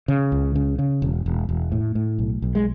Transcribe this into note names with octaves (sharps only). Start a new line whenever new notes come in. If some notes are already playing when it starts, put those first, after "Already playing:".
C#3
C#2
C#3
C#3
E1
E1
E1
A2
A2
B1
B1
G#3